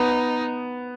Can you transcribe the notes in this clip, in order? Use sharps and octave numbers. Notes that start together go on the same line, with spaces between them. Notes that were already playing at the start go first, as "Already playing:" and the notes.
Already playing: B3 D#4